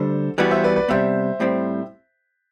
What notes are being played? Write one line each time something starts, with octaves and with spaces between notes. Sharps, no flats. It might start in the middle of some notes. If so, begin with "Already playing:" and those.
Already playing: D2 D3 G3 A4 C5
E3 G3 B3 F#4 B4 D5
C5 E5
B4 D5
B4 D5
C3 G3 B3 C5 E5
A2 G3 C4